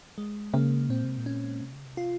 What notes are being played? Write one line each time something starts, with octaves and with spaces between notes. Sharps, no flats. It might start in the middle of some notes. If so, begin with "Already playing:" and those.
G#3
C#3 A#3
A#2 C4
C3
A#2
C#4
C3
C#3
C3
F4